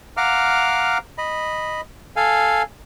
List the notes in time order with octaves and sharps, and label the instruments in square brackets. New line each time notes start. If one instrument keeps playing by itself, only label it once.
[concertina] F5 F#5 A#5 D6 F6
D#5 B5
A4 F5 G#5